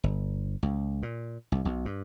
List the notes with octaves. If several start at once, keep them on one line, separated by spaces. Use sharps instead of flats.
G1
C#2
A#2
C2
B1
G2